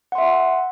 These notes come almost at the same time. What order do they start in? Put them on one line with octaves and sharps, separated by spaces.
F#5 C6 E5